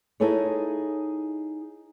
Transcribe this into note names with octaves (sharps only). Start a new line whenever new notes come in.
D#4 E4 G#4 A4 B4 C#5